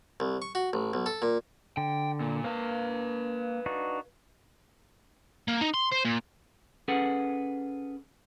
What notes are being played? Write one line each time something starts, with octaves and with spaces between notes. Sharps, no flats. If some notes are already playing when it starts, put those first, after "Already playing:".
C2
C#6
F#4
A1
B1
A4
A#2
D3 G5
A#2
A#3 B4 F5
D4 D#4 F#4
A#3
D#4
C6
C5
A#2
C#4 G#4 A4 B4 F#5